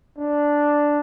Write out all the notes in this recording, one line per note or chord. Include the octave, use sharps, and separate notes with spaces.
D4